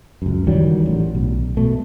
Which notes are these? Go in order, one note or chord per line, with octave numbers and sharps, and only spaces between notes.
C#2 F#2
D#3 E3 F#3 G3
A1
B1
B2 A3